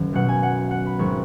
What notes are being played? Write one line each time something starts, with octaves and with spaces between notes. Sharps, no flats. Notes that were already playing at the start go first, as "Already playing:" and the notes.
Already playing: F#1 F#2 D#3
B1 B2 F#3 F#5
G#5
F#5
F#5
B5
G#1 F#3 C#6